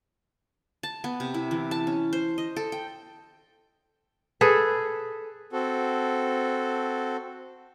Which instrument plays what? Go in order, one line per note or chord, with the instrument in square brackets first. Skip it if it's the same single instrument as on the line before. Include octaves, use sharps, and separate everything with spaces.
[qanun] A5
B3
C3
E4
E3
A5
C#4
C5
D#5
A4
G5
[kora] G#4 A4 B4
[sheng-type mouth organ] C4 F#4 A4